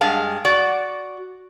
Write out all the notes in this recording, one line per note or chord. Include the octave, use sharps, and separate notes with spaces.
G2 G#3 F5 A5
F#4 D5